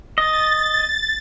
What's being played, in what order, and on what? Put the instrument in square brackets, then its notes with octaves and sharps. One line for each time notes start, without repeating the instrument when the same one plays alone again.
[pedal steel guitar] D#5 [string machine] A6